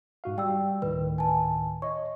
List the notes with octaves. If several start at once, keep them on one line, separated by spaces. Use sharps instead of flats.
G#2 F#4 F5
G3 G5 E6
D2 A2 D#3 B4
G#5 A5
C#5 D#5 C#6